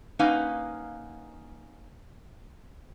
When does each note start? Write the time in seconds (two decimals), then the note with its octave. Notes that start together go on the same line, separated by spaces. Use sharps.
0.19 A#3 C#4 D#4 B4 F5 F#5